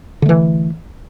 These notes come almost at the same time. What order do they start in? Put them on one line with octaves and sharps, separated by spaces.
D3 A3 E3